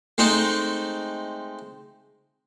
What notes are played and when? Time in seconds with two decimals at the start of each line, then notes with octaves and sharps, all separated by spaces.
0.18 G#3 A3 C4 D#4